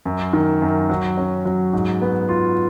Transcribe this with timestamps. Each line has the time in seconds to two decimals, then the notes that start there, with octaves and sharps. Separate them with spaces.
0.06 F#2
0.33 D#3
0.62 F#2
0.90 F#3
1.17 C#4
1.45 F#3
1.73 G#2
2.02 B3
2.29 F4